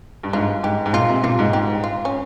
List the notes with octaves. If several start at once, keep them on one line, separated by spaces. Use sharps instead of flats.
G2
G#2 F4
G#2 G4
G#2
A#2 F4
C3
A#2 F4
G#2
G#2 G4
F4
C#4